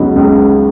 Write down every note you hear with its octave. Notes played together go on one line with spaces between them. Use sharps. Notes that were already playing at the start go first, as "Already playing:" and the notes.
Already playing: C#2 C#3 F#3 B3 D#4
C#2